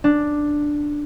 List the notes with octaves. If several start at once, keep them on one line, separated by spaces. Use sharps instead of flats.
D4